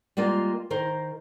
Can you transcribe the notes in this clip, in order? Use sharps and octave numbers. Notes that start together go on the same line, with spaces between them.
G3 G#3 A#3 F4
D#3 A#4 C5